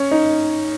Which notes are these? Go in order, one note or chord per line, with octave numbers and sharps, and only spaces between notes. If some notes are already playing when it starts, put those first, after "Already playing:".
Already playing: C#4
D#4